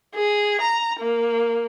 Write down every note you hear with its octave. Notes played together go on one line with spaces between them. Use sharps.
G#4
A#5
A#3